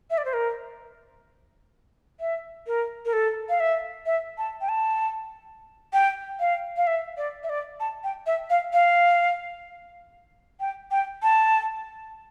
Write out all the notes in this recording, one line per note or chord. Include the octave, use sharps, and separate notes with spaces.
E5
D5
C5
A#4
E5
A#4
A#4
A4
F5
E5
E5
A5
G5
A5
G5
F5
F5
E5
D5
E5
D5
A5
G5
E5
F5
F5
G5
G5
A5